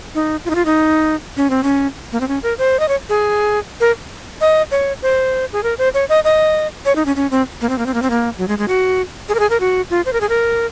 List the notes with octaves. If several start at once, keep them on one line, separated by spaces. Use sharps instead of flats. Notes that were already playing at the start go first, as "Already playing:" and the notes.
D#4
F4
D#4
F4
D#4
C#4
C4
C#4
A#3
C4
C#4
A#4
C5
D#5
C#5
G#4
A#4
D#5
C#5
C5
G#4
A#4
C5
C#5
D#5
D#5
C#5
D#4
C#4
C#4
C4
A#3
C4
A#3
C4
A#3
C4
A#3
F#3
G#3
G#3
F#4
G#4
A#4
G#4
A#4
F#4
F4
C5
A#4
G#4
A#4